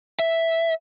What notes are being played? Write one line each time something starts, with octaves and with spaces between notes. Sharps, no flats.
E5